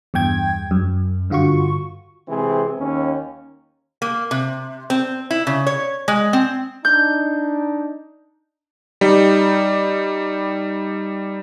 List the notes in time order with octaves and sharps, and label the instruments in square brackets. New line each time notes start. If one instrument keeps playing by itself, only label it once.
[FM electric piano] E2 G2 G5 G#6
F#2
G2 D3 F4 F#4 C#6
[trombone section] C3 E3 G#3 C4 G#4
D#2 C#4
[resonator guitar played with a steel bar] A#3
C3
C4
E4
C#3
C#5
G#3
C4
[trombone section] D4 D#4 [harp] G6
[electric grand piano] G3 D#4 G4